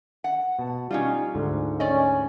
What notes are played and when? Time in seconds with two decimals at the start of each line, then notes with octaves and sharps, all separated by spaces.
0.24 F#5
0.59 B2 A5
0.91 G3 C#4 D#4 F4
1.35 D2 G#2 D3
1.80 C#4 D5 D#5